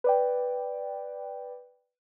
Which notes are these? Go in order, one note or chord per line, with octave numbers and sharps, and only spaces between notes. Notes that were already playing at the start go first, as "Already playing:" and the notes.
B4 D5 G5